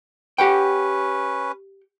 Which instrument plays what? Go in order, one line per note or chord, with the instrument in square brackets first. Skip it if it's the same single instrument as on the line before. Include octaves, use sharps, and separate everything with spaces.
[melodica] C#4 B4 [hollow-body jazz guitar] G4 F#5 G5